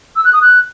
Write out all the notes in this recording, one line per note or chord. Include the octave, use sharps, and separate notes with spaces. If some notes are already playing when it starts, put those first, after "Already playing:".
E6
F#6
D#6
F#6